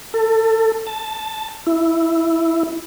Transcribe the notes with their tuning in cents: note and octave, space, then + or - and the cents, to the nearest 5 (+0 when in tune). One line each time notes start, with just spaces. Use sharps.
A4 +25
A5 +0
E4 +0